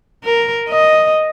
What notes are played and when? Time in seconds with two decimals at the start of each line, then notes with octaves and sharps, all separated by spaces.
0.25 A#4
0.69 D#5